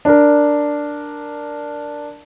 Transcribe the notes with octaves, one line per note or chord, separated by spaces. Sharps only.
D4 A#4